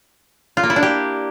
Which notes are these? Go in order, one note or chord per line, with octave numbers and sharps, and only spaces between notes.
F4
A#3
E4
D4
G4